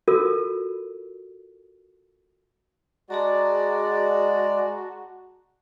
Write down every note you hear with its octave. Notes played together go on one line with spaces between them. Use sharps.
F4 F#4 A4 A#4
G#3 F#4 G#4 D5 A5 A#5